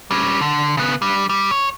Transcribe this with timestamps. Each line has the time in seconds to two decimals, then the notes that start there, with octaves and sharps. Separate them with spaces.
0.11 G3 C#4
0.41 D3
0.77 C#3 B3
1.02 G3 D4
1.29 G3
1.51 C#5